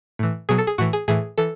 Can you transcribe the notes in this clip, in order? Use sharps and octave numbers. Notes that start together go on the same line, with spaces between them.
A2 E3
B2 F#3 G#4
A4
G#4
A2 E3 F#4
G#4
A2 E3 G#4
E3 A4